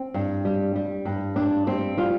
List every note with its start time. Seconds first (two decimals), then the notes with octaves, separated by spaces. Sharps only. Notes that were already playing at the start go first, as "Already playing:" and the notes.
Already playing: C4
0.14 G2
0.45 G3
0.76 G3
1.05 G2
1.36 G2 D4
1.67 G3 C4
1.97 G3 F4